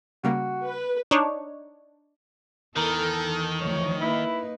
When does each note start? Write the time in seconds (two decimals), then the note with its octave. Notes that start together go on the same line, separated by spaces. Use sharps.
0.24 C#3 G3 A#3 F#4
0.63 B4
1.11 D4 D#4 C#5
2.76 E2 D#3 E3 A4 A#4
3.60 D2 F3 C#5
4.01 A#3 D#4 E4 B4